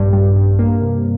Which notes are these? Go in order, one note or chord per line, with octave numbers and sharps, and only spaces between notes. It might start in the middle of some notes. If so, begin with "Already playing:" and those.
Already playing: A#1 G2
G3
G2
A#3
C3